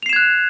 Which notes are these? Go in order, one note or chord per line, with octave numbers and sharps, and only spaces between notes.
F#6 G#6 C7 E7 F7